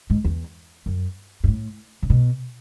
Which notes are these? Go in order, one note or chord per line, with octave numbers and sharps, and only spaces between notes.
G#2
E2
F#2
G#2
A2
C#3
B2